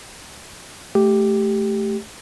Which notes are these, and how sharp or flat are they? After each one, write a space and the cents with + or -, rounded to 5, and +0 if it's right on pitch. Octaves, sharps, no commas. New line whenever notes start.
A3 -15 G4 +0